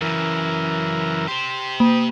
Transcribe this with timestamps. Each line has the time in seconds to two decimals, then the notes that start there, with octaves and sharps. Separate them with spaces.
0.01 F#2 C#3 E3 A#4
1.28 G4 C5 C6
1.80 A#3 D#6